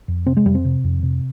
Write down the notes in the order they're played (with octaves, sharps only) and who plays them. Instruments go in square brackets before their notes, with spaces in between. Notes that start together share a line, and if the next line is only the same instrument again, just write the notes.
[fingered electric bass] F2
C3 C4
G#3
F2 G3
C4
C3
F2
C3